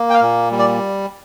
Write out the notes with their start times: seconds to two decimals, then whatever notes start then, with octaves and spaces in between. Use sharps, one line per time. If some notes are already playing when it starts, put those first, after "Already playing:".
Already playing: A#3
0.10 G5
0.14 F5
0.22 A#2
0.52 G3
0.59 D5